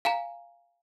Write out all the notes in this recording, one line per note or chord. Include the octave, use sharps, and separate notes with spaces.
F5 G#5 A#5